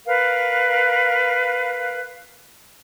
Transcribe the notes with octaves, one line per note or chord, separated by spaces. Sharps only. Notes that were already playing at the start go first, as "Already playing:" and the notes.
A#4 B4 F5